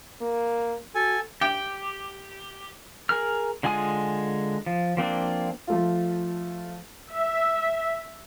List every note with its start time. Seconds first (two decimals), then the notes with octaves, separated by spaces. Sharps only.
0.21 A#3
0.95 F#4 A4 G#5
1.41 G4 G5
3.09 G#4 A#4 F6
3.63 D3 G#3 F4 G#5 D#6
4.66 F3
4.97 F3 A#3 C4 D4
5.67 F3 A3 F4
7.12 E5